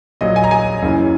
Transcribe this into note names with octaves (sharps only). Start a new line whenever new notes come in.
A#1 A#2 F#3 D#5
G#5
A#5
G#5
F#1 F#2 C#3 E3